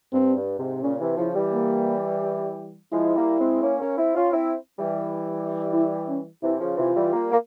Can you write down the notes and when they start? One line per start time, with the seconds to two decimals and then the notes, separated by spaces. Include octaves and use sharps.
0.13 G2 C4
0.36 G2
0.59 G#2 C3
0.82 A#2 C#3 C#4
1.01 C3 E3
1.17 C#3 F3 E4
1.35 E3 G3
1.53 A#3
2.92 F3 G#3 E4
3.16 G3 A#3
3.40 G#3 C4
3.63 A#3 C#4
3.80 A#3 C#4
3.98 C4 E4
4.15 C#4 F4
4.33 C4 E4
4.79 E3 G3
5.73 E4
6.09 C#4
6.43 C3 E3 E4
6.61 C#3 F3
6.78 C3 E3 F4
6.95 E3 G3
7.13 G3 A#3
7.32 A#3